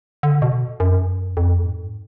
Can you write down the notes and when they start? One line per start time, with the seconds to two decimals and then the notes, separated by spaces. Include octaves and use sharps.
0.23 D3
0.42 B2
0.80 F#2
1.37 F2
1.65 G#2